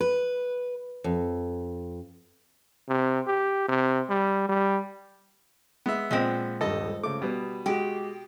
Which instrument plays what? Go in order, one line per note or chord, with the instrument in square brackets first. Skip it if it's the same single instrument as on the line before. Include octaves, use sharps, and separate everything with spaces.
[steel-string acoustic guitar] B4
F2
[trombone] C3
G4
C3
G3
G3
[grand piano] G#3 [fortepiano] B3 E5
[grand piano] A#2 [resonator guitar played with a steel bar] F3 G#3 C4
[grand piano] D#1 G2 [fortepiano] A4 D#5
[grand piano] C#3 A3 [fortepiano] D6
[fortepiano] B2 [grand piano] G3 B3
[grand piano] G#3 F#4 [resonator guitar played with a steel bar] G4